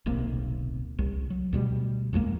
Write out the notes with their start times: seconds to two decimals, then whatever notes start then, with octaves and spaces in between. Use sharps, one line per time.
0.06 D1 B1 C3 A#3
0.99 C2
1.30 F#3
1.53 D2 B2 G3
2.13 A1 F2 G#3 A#3